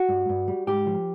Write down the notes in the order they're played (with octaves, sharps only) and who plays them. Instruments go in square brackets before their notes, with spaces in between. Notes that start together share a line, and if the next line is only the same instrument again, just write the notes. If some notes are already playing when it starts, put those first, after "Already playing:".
Already playing: [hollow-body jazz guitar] F#4
G2
G2
G3
G#2 G4
F3